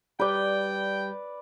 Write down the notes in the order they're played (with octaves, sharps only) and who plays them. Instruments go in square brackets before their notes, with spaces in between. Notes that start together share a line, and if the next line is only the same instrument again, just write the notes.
[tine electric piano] G3 [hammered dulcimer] B4 D5 [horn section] G5